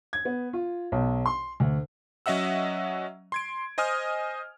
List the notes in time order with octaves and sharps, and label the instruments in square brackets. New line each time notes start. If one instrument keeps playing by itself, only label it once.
[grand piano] G#6
B3
F4
B1
C6
D2
[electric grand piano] F#3 C#4 D#5 E5 F#5 E6
C6 G#6 D7
C5 D#5 G#5 D#6 F6